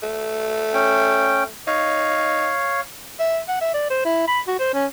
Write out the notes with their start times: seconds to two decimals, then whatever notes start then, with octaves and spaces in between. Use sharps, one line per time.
0.03 A3
0.74 C#4 G5
1.67 D#4 C#5 F5
3.20 E5
3.48 F#5
3.61 E5
3.74 D5
3.90 C5
4.05 E4
4.28 B5
4.48 F#4
4.59 C5
4.74 C#4